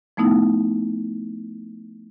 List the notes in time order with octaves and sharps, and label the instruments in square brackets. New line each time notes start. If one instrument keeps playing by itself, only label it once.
[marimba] F3 A3 B3 D#4 E4